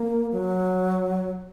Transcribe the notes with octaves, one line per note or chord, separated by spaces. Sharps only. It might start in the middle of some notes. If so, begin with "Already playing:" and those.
Already playing: A#3
F#3